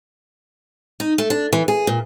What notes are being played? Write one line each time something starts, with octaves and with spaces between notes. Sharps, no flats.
D#4
A3
D4
E3
G#4
A#2